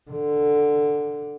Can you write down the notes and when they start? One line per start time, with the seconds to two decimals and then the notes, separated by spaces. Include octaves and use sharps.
0.11 D3